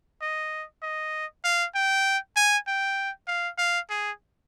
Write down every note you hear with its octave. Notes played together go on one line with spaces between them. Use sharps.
D#5
D#5
F5
G5
G#5
G5
F5
F5
G#4